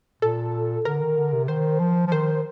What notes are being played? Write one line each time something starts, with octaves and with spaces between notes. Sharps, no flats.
A#2 A4
D3 A#4
D#3
D3
C3
D#3 C5
F3
F3
D#3 C5